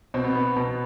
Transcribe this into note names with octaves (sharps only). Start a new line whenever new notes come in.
B2 C4
B3
B3
B2